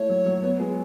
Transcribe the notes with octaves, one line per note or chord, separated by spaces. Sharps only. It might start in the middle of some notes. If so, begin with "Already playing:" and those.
Already playing: A3 E4 C#5
F#3
F#3
B3
G#3